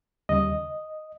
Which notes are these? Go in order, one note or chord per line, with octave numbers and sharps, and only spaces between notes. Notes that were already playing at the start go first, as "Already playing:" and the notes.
D#2 C#3 G3 D#5